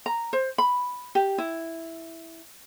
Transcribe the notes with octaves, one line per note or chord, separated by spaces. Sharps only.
A#5
C5
B5
G4
E4